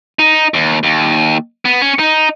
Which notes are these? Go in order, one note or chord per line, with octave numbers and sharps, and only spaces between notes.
D#4
D#2
D#2
B3
C#4
D#4